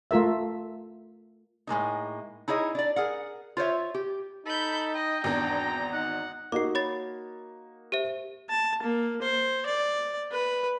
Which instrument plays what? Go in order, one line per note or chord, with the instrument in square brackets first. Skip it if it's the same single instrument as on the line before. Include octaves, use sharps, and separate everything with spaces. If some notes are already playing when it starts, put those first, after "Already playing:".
[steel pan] A3 F4 A#4 E5
[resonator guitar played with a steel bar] A2 G#3 A#3 D#4
D#4 E4 G#4 C#5 D#5
D4 D5
G#4 A#4 F#5
F4 C5 C#5 E5
G4
[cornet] D#4 [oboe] A4 [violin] B5 G6
[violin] D#5 [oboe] G5
[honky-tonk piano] G#1 E2 [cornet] D4 [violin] A#5
[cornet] D#4 [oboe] F#5
[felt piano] A#3 D#4 F#4 [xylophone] D6 C7
[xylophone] C#5 B5 A6
G4 C5 E5
[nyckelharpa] A5
A#3
C5
D5
B4